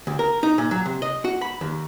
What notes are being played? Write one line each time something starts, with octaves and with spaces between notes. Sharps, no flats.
D2
A#4
D#4
A#2
F#3
C3
D#5
F#4
B5
D#2